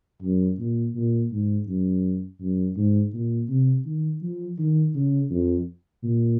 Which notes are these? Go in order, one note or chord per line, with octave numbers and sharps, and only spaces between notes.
F#2
A#2
A#2
G#2
F#2
F#2
G#2
A#2
C3
D#3
F3
D#3
C#3
F2
A#2